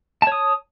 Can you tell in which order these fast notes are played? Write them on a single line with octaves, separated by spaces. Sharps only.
A5 C#5 D#6